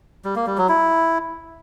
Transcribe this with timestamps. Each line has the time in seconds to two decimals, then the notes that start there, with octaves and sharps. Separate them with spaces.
0.25 G3
0.36 A#3
0.47 G3
0.58 F#3
0.69 E4